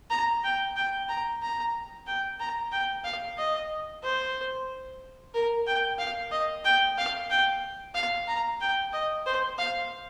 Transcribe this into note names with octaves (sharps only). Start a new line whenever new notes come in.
A#5
G5
G5
A#5
A#5
G5
A#5
G5
F5
D#5
C5
A#4
G5
F5
D#5
G5
F5
G5
F5
A#5
G5
D#5
C5
F5